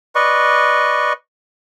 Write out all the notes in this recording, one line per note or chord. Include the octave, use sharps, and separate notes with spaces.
B4 D5 D#5 C#6